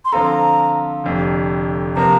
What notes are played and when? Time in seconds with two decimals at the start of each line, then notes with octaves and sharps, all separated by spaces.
0.05 C6
0.12 D3 F3 C4 F4 A4 A#5
1.04 F1 F2 D3
1.96 C3 F3 A#3 A#5